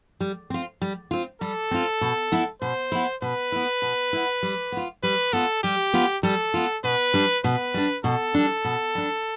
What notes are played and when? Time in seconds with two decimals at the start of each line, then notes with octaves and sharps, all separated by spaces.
0.20 G3
0.50 C4 F4
0.81 G3
1.11 C4 F4
1.41 G3 A4
1.71 C4 F4
2.01 B2
2.32 B3 E4
2.62 B2 C5
2.92 B3 E4
3.22 B2 B4
3.52 B3 E4
3.82 B2
4.13 B3 E4
4.43 G3
4.72 B3 F4
5.03 G3 B4
5.33 B3 F4 A4
5.63 G3 G4
5.94 B3 F4
6.23 G3 A4
6.54 B3 F4
6.84 B2 B4
7.14 G3 D4
7.44 B2 B4
7.74 G3 D4
8.04 B2 A4
8.34 G3 D4
8.64 B2
8.95 G3 D4